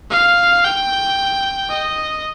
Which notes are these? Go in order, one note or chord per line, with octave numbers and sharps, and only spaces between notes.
F5
G5
D#5